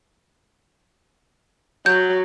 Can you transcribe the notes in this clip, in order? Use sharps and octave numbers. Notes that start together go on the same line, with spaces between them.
F#3 G6